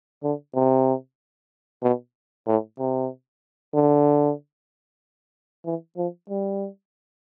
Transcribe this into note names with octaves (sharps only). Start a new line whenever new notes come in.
D3
C3
B2
A2
C3
D3
E3
F3
G3